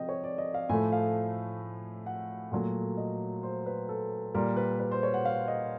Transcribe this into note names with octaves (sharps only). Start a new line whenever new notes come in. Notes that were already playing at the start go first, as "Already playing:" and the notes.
Already playing: C3 F3 D#5 G5
C#5
D5
D#5
F5
A2 F3 A3 G#5
F5
F#5
A#2 F#3 A3
D#5
C5
B4
A4
A#2 G3 A#4
B4
B4
C5
C#5
F#5
F5
D#5